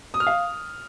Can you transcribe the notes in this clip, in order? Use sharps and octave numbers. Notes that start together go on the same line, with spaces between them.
D#6
F6
F5